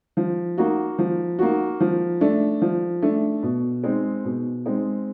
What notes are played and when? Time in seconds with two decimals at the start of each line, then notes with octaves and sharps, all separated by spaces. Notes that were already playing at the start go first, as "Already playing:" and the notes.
0.17 F3
0.58 A#3 D#4 F#4
0.99 F3
1.39 A#3 D#4 F#4
1.80 F3
2.21 A3 D4
2.62 F3
3.02 A3 D4
3.43 B2
3.83 G#3 C4 D#4
4.25 B2
4.66 G#3 C4 D#4